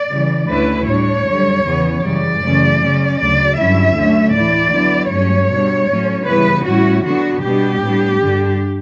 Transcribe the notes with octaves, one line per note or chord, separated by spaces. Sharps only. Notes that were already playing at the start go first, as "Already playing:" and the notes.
Already playing: D5
C#3 E3 G3
D2 D3 A3 C#4 E4 B4
A2 G3 D4 C#5
F#2 D3 G3
E2 C#3 E3 B3
F#2 C#3 E3 G3 D5
F#2 C#3 E3 A3 C#4
C#3 F#3 C#4
D2 C#3 F#3 D5
G2 D3 F#3 C#4 E4 E5
D2 D3 F#3 A3 C#4
A2 E3 A3 E4 D5
D3 F#3 B3 E4
G2 F#3 A3 C#4 C#5
B2 G3 D4
A2 F#3 A3 C#4
C#3 E3 G3 B3 E4 B4
A2 G3 C#4 E4 F#4
D3 F#3 B3 D4 F#4
B2 G3 B3 D4 G4
A2 G3 B3 D4
G2 D3 G3 D4